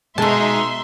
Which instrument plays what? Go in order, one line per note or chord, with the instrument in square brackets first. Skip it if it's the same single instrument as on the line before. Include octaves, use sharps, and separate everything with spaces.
[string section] B2 D#4 [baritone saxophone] G#3 [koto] A3 A5 [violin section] E5 C6